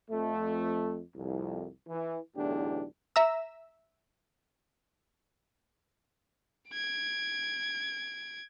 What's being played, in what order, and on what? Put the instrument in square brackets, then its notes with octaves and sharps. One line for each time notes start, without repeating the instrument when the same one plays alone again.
[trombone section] F2 A3
C2 F2
E3
B1 E2 A2 D3 D4 G4
[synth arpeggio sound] E5 A#5 E6
[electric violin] G#6 D7